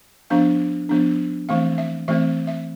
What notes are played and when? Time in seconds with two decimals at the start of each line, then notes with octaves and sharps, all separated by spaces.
0.30 F3 B3 D4 F5
0.89 F3 B3 D4
1.49 E3 A3 C4 F5
1.78 E5
2.08 E3 A3 C4 E5
2.47 E5